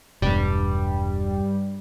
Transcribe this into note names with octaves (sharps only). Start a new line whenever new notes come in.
E1 G2 G3